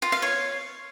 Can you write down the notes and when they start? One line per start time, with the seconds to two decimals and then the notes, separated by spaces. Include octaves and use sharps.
0.02 F4
0.12 F5
0.22 C#5